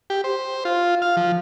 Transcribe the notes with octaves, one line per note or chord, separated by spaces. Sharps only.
G4
C5
F4
F5
F3